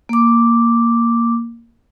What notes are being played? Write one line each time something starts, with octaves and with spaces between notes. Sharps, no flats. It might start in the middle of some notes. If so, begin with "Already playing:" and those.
A#3 D6